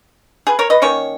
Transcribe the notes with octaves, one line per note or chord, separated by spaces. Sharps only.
G#4 B4
A#4 C#5
B4 D#5
D#3 A#3 C#4 C#5